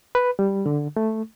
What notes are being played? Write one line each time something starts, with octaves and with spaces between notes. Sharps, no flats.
B4
G3
D3
A3